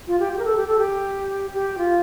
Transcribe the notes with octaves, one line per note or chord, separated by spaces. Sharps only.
F4
G4
G4
A#4
A4
G4
A4
G4
G4
F4